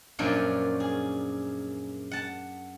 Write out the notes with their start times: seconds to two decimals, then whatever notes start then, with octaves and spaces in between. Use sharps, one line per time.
0.19 F#2 A#2 F3 D4 C#5
0.80 G#4
2.11 F#5 A5